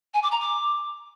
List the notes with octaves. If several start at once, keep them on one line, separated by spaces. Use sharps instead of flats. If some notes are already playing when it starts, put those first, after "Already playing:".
G#5
D6
A#5
D6